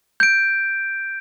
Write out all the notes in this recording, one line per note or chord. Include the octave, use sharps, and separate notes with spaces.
G6 D7